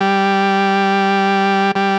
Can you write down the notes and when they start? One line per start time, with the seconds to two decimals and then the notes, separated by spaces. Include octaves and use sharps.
0.01 G3
1.75 G3